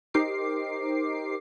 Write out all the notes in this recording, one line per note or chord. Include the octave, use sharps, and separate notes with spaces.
D#4 G4 A#4 C5 D6 C7